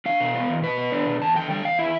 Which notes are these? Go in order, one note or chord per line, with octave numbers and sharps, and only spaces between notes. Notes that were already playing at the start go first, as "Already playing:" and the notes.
D4 F5
B2
B3
E2
B2 B4
B3
D4
B2
E2 A5
D3 G5
G3 G5
E2 F5
E4 E5